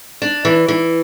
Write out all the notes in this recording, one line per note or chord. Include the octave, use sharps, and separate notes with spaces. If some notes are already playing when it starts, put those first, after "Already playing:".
D4
E3
E3